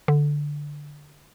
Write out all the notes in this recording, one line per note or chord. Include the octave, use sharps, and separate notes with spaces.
D3